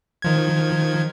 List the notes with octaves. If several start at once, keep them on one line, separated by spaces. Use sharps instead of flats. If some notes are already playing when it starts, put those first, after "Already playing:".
D#3 F3 G#6